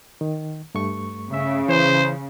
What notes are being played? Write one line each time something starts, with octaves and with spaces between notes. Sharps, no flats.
D#3
G2 A3 C#6
C#3 E5
E3 C5